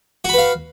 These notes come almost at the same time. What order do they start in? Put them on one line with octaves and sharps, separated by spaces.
F#4 B5 B4 F5